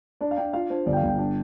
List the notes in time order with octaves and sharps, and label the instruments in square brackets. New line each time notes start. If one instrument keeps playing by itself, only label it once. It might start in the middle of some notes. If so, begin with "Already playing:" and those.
[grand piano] D4 D5
F5
D4 G5
F4 F5
D4 C5
G1 D5
G5
F5
G1
G5
D4